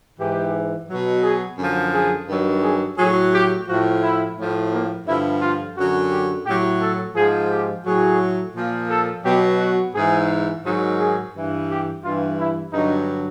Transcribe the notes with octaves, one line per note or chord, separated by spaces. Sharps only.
G#2 E3 G4
B2 F#3
G#4
F#2 D3 F3
G#4
G2 D#3 F#3
G#4
A2 F#3 G#4
G4
A2 F3 F#4
E4
A2 F3
A#3
G2 D3 F3 E4
F4
F#2 D3 F#3 F#4
G4
A2 F#3 G4
A4
G#2 F3 G#4
G4
A2 F#3 G#4
A#2 F3
A4
B2 F#3 G4
F#4
G#2 E3 G#4
G#2 D#3 F#3
G#4
G2 E3
G4
G2 E3 F4
E4
G2 D3 F#3 D#4